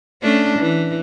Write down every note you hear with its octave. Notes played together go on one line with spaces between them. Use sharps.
A3 C#4 D4
E3